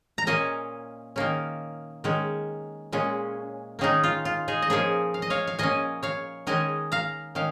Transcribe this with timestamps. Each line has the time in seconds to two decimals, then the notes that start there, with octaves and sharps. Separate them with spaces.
0.18 A#5
0.27 A#2 A#3 C#4 D#5 G#5
1.16 D#3 A#3 C#4
2.04 D#3 G#3 C#4
2.93 A#2 G#3 C#4
3.79 D#3 A#3 C#4 D#4 G#4
4.04 F4
4.25 F4
4.48 D#4 G#4
4.62 D#5
4.70 A#2 F3 A#3 C#4 G#4 C#5
5.14 F5
5.22 D#5
5.30 C#5 F5
5.47 F5
5.59 A#2 A#3 C#4 D#5 G#5
6.03 C#5 F5
6.47 D#3 G#3 C#4 D#5 G#5
6.92 F5 A#5
7.35 D#3 C#4 F5